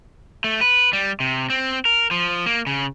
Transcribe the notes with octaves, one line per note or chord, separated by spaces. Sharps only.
A3
B4
G3
C3
C4
A#4
F3
A#3
C#3